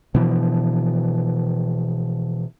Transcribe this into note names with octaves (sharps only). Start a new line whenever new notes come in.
B2 E3 F3